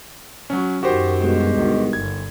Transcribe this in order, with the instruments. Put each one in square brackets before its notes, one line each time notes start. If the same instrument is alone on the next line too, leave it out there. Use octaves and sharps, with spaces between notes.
[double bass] F#3 [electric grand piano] C#4
[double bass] F#2 D#3 [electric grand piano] F#4 G4 C5
[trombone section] G2 B2 G#3
[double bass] D2 D#3
[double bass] G1 [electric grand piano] G#6